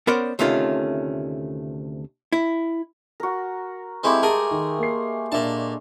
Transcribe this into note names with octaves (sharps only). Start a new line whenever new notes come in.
B3 C#4 A#4 C5 D5 F#5
D2 C3 D#3 A3 C#4 F4
E4
F#4 A#4
G#3 A3 C4 E4 G4
G#4 A#4 A5
D#3
A#3 C7
A#2 D4 E5 F5 A5